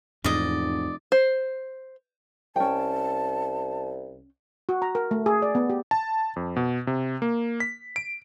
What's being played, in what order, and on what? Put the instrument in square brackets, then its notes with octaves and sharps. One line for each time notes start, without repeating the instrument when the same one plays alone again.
[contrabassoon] F1 [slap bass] E2 G#2 [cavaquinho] D5 D#5
[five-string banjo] C5
[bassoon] C2 [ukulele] C#4 G5 [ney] A5
[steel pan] F#4
A#5
A#4
A3
G#4
D5
B3
G4
[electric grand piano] A5
F2
B2
C3
A#3
B6
D7